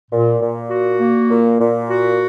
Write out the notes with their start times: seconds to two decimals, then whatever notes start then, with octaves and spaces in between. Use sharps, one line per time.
0.11 A#2
0.40 A#2
0.70 F#4
0.99 A#3
1.29 A#2
1.59 A#2
1.88 F#4